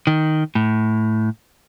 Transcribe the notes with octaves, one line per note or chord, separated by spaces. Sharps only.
D#3
A2